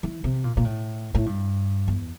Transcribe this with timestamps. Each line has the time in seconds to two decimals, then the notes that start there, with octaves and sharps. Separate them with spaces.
0.03 E3
0.24 C3
0.44 A#2
0.57 A#2
0.65 A2
1.15 A2
1.26 G2
1.88 E2